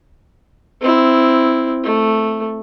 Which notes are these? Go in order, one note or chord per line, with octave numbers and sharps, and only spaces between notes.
C4 E4
A3